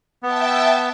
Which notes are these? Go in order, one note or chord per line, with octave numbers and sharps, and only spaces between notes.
B3 E5 G5 A5